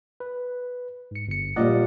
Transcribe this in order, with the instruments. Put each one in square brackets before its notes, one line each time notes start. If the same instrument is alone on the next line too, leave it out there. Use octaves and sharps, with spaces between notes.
[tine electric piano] B4
G#2 C#7
G1 C#7
[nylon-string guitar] A#2 F3 G3 [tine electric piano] D5 D#5 F#5